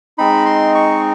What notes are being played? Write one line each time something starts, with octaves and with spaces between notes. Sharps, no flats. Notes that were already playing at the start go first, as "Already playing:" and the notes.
G#3 C4 D#4 B5
C6
C#6